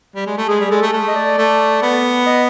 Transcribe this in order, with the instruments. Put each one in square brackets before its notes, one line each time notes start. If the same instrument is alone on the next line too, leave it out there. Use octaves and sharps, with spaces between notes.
[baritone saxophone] G3
G#3
A3
[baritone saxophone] G#3 [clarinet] G#4
[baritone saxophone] G3
[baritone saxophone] G#3 [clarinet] A4
[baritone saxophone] A3
A3
[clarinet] D#5
D5
[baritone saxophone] A3
B3
[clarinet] D#5